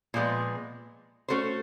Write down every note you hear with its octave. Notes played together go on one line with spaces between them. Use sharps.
A#2 F3 G#3 B3
A3 C#4 F#4 A4 C5